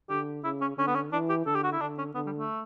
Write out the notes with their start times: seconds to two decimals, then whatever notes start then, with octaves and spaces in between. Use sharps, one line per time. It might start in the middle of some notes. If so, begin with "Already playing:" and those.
0.10 D3 G4
0.44 C#3 E4
0.61 C#4
0.78 D3 C#4
0.87 B3
0.95 C#4
1.12 E3 D4
1.29 G4
1.46 D3 A4
1.55 G4
1.64 F#4
1.72 E4
1.80 D3 D4
1.98 C#4
2.15 D3 B3
2.26 G3
2.38 A3